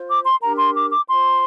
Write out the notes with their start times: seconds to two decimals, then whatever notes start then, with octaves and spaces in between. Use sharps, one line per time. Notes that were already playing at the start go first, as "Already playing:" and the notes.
Already playing: F4 C5
0.08 D6
0.24 C6
0.41 D4 G4 A#4 A#5
0.58 C6
0.74 D6
0.90 D6
1.07 F4 C5 C6